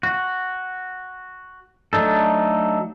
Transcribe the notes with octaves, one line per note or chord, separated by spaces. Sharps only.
F#4
F#3 A3 D4 D#4 A4